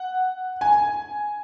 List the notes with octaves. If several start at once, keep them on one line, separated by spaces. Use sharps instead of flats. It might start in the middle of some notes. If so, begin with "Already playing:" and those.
Already playing: F#5
G#5